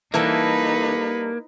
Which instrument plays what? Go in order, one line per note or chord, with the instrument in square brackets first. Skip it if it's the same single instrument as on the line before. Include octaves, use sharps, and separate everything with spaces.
[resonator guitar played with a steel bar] E3 [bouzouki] G3 A4 E5 [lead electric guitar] A#3 [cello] D#4 B4